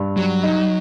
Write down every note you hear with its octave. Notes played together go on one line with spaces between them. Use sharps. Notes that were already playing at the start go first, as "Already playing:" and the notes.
Already playing: G2
F#3 G3
D#4